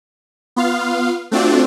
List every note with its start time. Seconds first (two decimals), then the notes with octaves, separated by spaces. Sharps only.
0.56 B3 F4 F5
1.31 A3 C4 D4 F4 F#4 D5